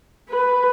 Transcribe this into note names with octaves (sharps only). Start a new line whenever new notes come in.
B4